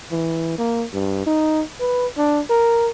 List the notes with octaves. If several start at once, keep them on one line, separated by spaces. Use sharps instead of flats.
E3
A#3
G2
D#4
B4
D4
A#4